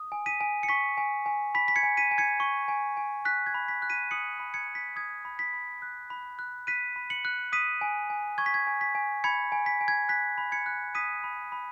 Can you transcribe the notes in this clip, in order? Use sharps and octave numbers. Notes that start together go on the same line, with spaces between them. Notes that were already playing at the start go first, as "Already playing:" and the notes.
Already playing: D#6
G#5
B6 D#7
G#5
C#7
C#6 B6
G#5
G#5
B5 B6
B6
G#6 C#7
G#5
B6 D#7
G#5
G#6 C#7
C#6
G#5
G#5
F#6 B6
G#6
B5
B6
F#6
B6 D#7
D#6 C#7 F#7
B5
G#6 C#7
B5
B6
D#6 G#6
B5
B6
B5
F#6
B5
F#6
F#6 B6 D#7
B5
C#7 F#7
F#6
D#6 B6 D#7
G#5
G#5
C#6 G#6
B6
G#6
G#5
B6
G#5
B5 G#6 C#7
G#5
B6
G#5
G#6
F#6 B6
B5
G#6 C#7
F#6
D#6 B6 D#7
B5
B5